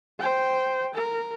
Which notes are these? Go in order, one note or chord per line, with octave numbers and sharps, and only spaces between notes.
C5 G5
A#4